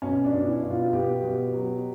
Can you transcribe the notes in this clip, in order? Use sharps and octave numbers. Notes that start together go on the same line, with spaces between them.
B2 C#4
D4
B2
E4
B2
F4
B2 G4
B2
F#3